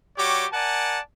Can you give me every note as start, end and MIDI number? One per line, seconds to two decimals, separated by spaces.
0.18 0.46 55
0.18 0.46 66
0.18 0.46 67
0.18 0.46 73
0.18 0.46 86
0.53 0.99 70
0.53 0.99 74
0.53 0.99 78
0.53 0.99 80
0.53 0.99 81